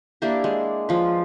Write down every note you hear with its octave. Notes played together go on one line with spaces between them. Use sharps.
A#3 D4 E4 G4
G#3
F3 B4